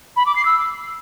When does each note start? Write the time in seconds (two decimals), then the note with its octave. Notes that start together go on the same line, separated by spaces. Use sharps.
0.16 B5
0.26 D6
0.36 C7
0.45 E6